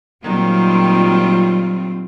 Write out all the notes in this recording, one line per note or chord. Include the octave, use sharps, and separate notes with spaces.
A#2 D#3 F#3 G3 C4 F4